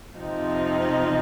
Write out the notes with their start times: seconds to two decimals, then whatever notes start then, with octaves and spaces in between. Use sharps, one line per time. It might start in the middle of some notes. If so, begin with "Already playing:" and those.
0.16 F2 C3 F3 C4 D#4